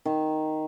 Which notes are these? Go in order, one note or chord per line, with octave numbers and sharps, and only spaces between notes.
D#3